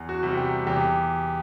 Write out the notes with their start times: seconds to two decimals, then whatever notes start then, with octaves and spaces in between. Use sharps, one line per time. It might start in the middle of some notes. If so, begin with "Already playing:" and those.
Already playing: E2
0.09 F#4
0.23 C3 G3
0.37 G4
0.67 E2 G4